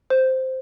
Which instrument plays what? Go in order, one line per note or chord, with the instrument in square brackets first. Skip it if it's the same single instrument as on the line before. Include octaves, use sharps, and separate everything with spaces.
[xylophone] C5